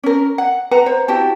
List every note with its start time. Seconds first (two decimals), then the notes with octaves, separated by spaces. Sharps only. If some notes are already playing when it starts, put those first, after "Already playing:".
0.04 C#4 A#4
0.38 F#5
0.71 B4 F#5 A#5
0.86 C5
1.08 E4 F#4 G4 A5